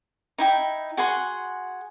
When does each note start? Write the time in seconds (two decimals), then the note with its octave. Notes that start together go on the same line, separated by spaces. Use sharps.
0.38 D#4 E4 G5
0.97 F#4 G#4 F#5 C6